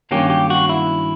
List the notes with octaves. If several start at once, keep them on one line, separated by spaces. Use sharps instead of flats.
G2 D#3 F#3 A#3 C#4 G4
G4
F#4
E4